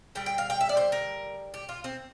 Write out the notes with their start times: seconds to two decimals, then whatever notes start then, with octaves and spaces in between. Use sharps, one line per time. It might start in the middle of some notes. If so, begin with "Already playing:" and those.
0.15 D3 G3 G5
0.26 G5
0.38 F5
0.50 G5
0.61 E5
0.69 D5
0.77 C5
0.92 A#4
1.54 G4
1.69 F4
1.84 C4